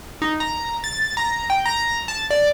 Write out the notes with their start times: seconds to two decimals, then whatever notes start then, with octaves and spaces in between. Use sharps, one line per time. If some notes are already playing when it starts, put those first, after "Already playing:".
0.22 D#4
0.40 A#5
0.84 A6
1.17 A#5
1.50 G5
1.66 A#5
2.08 A5
2.31 D5